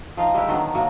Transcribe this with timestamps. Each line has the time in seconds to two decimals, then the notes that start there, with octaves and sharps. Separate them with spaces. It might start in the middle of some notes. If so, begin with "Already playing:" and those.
0.17 F3 D#4 F5
0.34 G3 G#3 E4 G4
0.48 D3 D#3 F#3 B3
0.75 A2 F#3 A#3